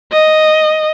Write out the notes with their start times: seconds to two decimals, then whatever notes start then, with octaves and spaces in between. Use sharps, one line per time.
0.12 D#5